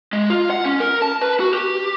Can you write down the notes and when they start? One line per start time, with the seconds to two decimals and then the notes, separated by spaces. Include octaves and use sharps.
0.13 G#3
0.30 F4
0.50 F#5
0.65 C#4
0.80 A#4
1.02 A5
1.22 B4
1.40 F#4
1.54 G4